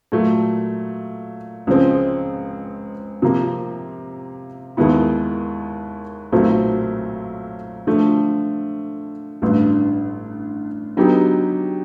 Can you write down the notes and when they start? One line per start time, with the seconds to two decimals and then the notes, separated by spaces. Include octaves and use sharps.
0.12 A#2 F#3 A3
1.67 C#2 C#3 F3 G#3 C4
3.22 C3 F3 A#3
4.77 D#2 D#3 G#3 B3 E4
6.32 B1 A#2 F#3 A3 C4
7.87 D3 F3 A3
9.42 A1 G2 D3
10.97 D3 F#3 B3 D#4 G4